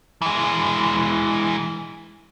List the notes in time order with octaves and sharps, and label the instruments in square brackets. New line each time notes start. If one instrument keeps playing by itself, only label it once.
[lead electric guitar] E3 G#3